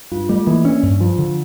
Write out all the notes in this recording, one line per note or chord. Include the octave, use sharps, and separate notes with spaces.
G2 F4
G3 A3
E3 A#3
C#4 D4
G2
F3 F4
D3